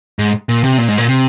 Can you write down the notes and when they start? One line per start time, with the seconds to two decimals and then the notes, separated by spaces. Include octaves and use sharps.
0.19 G#2
0.49 A#2
0.64 C3
0.78 A#2
0.88 G#2
0.98 A#2
1.08 C3